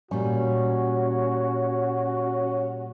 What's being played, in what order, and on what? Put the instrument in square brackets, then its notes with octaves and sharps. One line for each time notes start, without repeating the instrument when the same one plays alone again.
[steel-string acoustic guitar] A#2 G3 [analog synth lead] C#4 [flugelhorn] F#4